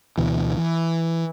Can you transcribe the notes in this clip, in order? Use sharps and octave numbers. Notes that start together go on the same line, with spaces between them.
D2 B2 E3
E3